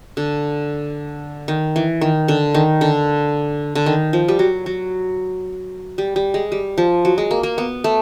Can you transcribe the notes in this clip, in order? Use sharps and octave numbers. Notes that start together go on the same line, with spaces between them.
D3
D#3
E3
D#3
D3
D#3
D3
D3
D#3
F3
G3
F#3
F#3
G3
G3
G#3
G3
F3
F#3
G#3
A#3
A#3
B3
A3